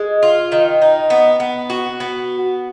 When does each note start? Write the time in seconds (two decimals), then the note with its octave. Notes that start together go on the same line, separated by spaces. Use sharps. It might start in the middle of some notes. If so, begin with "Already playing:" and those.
Already playing: G#3
0.23 F4
0.52 D#3
0.82 D#4
1.10 B3
1.40 B3
1.70 F#4
2.00 B3